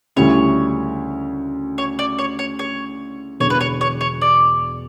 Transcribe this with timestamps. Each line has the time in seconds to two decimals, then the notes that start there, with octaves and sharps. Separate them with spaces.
0.16 D2 C#3 G3 C#4 E4 C#5
1.78 C#5
1.99 D5
2.19 C#5
2.39 C#5
2.59 C#5
3.40 E1 E2 D3 C#5
3.50 B4
3.61 C#5
3.81 C#5
4.01 C#5
4.21 D5